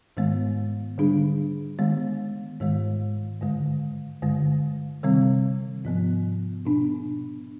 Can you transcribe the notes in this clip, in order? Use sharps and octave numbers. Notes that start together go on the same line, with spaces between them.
G#2 D#3 G#3 B3
D3 G3 D4 G#4
D#3 G#3 B3
G#2 D#3 G#3
G2 D3 G#3
G2 D3 G#3
C3 D#3 G3 C4
G#2 F3 B3
B2 B3 D4